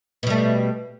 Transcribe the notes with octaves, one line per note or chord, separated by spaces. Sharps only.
B2 G3 A3